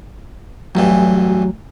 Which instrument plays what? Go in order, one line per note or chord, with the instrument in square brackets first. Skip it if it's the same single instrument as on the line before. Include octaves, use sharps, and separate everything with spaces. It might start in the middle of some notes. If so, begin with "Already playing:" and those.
[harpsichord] A1 G2 E3 [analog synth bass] F#3